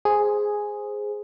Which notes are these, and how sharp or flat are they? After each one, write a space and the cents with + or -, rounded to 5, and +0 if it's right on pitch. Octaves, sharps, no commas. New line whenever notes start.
G#4 +0 C5 +0